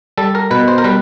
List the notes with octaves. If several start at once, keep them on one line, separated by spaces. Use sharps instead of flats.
G3 A4
A#4
B2 B4
C5
A#4
G3 B4